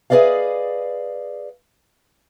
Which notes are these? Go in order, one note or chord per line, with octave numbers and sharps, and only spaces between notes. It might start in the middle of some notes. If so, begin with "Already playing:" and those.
G#4 B4 D5 D#5 F5